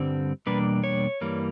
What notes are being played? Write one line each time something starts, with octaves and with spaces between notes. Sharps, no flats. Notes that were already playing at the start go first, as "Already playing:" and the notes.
Already playing: G2 D3 G3 C4
E2 B2 G3 A#3 D4 B4
C#5
G2 E3 G3 A#3